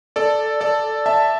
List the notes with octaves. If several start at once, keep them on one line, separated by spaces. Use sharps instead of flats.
A4 D5
A4 D5
E5 A5